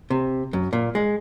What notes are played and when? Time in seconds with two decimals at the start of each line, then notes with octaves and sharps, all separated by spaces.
0.10 C3
0.53 F#2
0.73 A#2
0.95 G#3